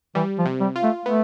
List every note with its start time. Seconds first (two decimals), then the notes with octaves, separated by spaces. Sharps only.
0.15 E3 G3
0.39 F3
0.45 C3
0.61 G3
0.76 F4
0.83 A3
1.06 A3 B3